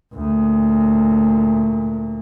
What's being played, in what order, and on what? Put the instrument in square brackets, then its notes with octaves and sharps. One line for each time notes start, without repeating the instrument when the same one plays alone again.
[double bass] D2 A#2